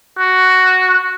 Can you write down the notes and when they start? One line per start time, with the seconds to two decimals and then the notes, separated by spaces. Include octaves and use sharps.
0.19 F#4